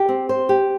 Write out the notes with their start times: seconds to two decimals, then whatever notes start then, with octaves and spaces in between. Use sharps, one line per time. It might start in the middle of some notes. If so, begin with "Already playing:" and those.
Already playing: G4
0.09 C4
0.29 C5
0.49 G4